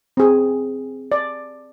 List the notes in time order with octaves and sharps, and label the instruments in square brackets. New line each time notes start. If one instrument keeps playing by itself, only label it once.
[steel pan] C4 G#4
D5